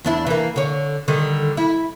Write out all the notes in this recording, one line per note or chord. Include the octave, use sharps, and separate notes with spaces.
E2 D4 E4
E3 A#3
D3 C#5
D3 D#3 G3
E4